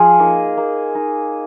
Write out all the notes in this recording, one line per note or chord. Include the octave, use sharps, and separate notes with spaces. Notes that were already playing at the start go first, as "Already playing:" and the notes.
Already playing: F3 G#4
A#3 D#4
A#3
D#4